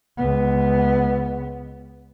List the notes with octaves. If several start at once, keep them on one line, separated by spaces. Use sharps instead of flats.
C#2 B3